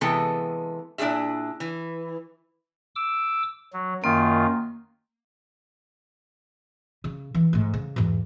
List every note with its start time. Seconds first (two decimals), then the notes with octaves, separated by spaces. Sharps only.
0.01 C3 E3 G#3 B3 A4
0.98 A#2 D4 E4 G#4 E5
1.60 E3
2.96 D6 E6
3.73 F#3
4.04 F#2 D#3 A#3 F4
7.04 C#3
7.34 E3
7.53 G#2 A3
7.73 C#3
7.96 E2 G#2